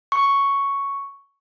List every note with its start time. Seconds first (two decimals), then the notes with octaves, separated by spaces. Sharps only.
0.12 C#6